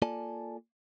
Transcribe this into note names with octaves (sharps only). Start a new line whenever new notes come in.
A#3 F4 A4 D5 G#5 A5